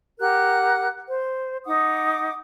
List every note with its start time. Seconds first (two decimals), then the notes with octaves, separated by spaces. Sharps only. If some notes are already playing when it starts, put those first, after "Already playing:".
0.20 G4 A#4 F#5 F#6
1.07 C5
1.65 D#4 F#5 D6 D#6